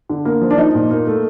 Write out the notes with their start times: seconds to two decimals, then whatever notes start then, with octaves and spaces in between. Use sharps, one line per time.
0.09 D3
0.25 A#3
0.41 F3
0.51 D4
0.58 F3 D#4
0.74 A#2
0.91 A#3
1.07 A3